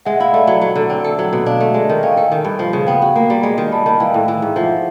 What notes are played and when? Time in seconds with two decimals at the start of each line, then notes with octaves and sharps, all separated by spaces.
0.05 G#3 E5 F#5
0.20 E4 D#5 F5
0.34 A3 D5 E5
0.47 F#3
0.61 F#3
0.76 D3
0.90 C4
1.04 A4
1.19 F#3
1.33 B2
1.46 D4 D#5 F5
1.60 A3
1.74 G#3
1.89 D#3
2.03 C#4 F5 G5
2.17 A4
2.32 D#3
2.45 G2
2.59 F3
2.73 C#3
2.87 B3 F5 G5
3.02 F#4
3.16 A#3
3.30 G3
3.43 G#3
3.58 D#3
3.72 G3 A5 B5
3.86 D#3 A5 B5
4.00 E3 F5 G5
4.14 A2
4.28 E3
4.42 G#2
4.56 F3 E5 F#5